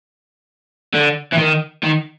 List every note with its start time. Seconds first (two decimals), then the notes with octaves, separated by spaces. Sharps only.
0.94 D3
1.33 E3
1.38 D#3
1.84 D#3